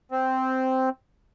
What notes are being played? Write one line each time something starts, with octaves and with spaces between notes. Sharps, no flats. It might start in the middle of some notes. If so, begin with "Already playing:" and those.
C4